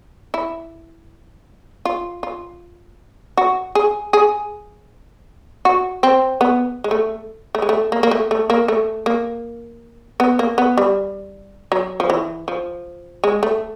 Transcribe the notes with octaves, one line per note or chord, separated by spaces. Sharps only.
E4
F4
F4
F#4
G#4
G#4
F#4
C4
B3
G#3
A3
A3
G#3
A3
A#3
A#3
A3
A3
A#3
A3
A#3
B3
A#3
B3
G3
F#3
F3
E3
F3
G#3
A3